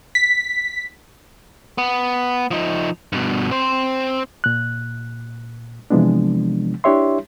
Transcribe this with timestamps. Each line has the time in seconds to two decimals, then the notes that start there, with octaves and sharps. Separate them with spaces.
0.15 B6
1.78 B3
2.51 F3 D#4
3.13 G2 B2
3.51 C4 C5
4.44 A#2 F#6
5.90 C3 E3 F3 G#3 B3 D4
6.84 D4 E4 G4 C#5 E5 C6